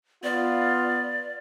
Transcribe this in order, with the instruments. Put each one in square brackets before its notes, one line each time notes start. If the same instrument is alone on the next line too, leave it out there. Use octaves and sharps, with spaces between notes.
[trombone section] B3 F4 [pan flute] D5